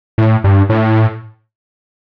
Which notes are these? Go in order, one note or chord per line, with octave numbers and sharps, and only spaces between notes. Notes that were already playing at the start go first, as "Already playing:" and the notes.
A2
G2
A2